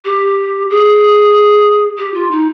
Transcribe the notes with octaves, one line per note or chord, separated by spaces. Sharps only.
G4
G#4
G4
F4
D#4